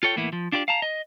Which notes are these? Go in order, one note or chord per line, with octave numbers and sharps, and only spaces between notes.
F4 A4 C#5 G5
A2 E3 A#3 B3 E4
F3
D4 F4 G4 C5 D5
F5 A5 A#5
D#5